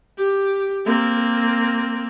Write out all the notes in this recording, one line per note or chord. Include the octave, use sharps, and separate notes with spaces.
G4
A#3 C4